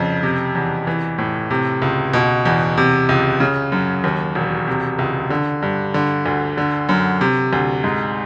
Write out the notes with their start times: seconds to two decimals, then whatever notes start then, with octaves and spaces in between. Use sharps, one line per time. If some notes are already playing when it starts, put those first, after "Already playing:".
Already playing: C2 F2 C#3
0.23 C3
0.55 E2
0.87 E3
1.18 A2
1.51 C3
1.82 C#2
2.13 B2
2.46 E2
2.78 C3
3.09 C#2
3.40 C#3
3.72 F#2
4.04 D#2
4.35 E1
4.67 C3
4.99 C#2
5.30 D3
5.62 G2
5.94 D3
6.26 D2
6.58 D3
6.89 F#2
7.21 C3
7.53 D2
7.84 G#2